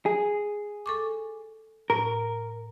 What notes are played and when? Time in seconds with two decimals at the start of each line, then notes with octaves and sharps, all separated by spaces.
0.06 G#4
0.86 A4 C#6 D6
1.90 A2 A#4